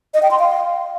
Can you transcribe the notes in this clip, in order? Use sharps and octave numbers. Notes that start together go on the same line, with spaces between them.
D#5
G5
C6
F5